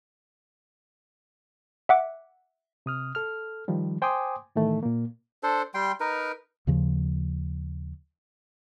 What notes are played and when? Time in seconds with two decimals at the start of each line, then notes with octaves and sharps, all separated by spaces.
1.89 E5 F#5 D6
2.86 C3 D#6 F6
3.15 A4 F6
3.68 D#3 F3 G3
4.02 C5 G5 G#5 C6 D6 D#6
4.56 A2 D#3 E3 A3
4.83 A#2 A#3
5.43 D4 A4 C5
5.74 G3 G5 C6
6.00 D#4 A#4 B4
6.67 D#2 C#3 F3